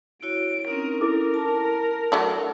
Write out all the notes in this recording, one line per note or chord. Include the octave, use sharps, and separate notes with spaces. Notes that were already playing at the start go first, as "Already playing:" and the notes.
E4 F#4 C#5 D7
C4 C#4 D#4 A#4
E4 A4 A#4 D6
A5
F#3 A3 D4